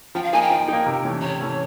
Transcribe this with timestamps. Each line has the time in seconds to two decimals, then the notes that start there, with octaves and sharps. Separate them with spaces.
0.15 F3 G5
0.23 F5
0.32 A#3 D#4 G#5
0.41 G5
0.50 F3
0.68 A#3 D#4
0.86 C3
1.04 E3 A3 C#4
1.21 C3 C#5
1.40 E3 A3 C#4